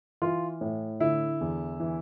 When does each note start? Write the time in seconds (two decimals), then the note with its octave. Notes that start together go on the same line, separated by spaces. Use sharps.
0.22 E3 F4
0.61 A2
1.00 D3 E4
1.41 E2
1.80 E3